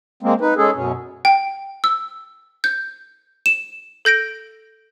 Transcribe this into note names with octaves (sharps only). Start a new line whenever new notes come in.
G#3 A#3 C4
D#4 B4
G#3 C#4 G#4 A4
F#2 B2 C#4
G5
E6
G6
E7
A4 G6 A#6 D7